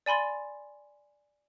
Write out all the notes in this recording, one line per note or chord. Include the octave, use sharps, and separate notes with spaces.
D5 G#5 B5 C6 A6